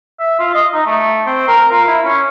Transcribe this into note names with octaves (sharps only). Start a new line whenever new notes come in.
E5
F4
D#5
D#4
A3
C4
A#4
F4
E4
C#4